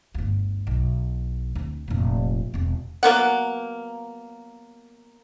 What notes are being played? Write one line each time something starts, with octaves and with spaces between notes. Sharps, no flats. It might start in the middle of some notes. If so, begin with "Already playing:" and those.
G1 D2
B1
D2 C4
F1 A#2
E1 C4
F#3 A#3 B3 F#5